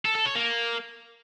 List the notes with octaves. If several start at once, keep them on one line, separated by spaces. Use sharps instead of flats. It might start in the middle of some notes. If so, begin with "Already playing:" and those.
A4
A4
C#5
A#3